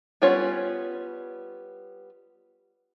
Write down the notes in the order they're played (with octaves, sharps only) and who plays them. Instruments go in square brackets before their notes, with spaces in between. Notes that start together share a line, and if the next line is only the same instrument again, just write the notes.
[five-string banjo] G3 B3 C#4 F4 C#5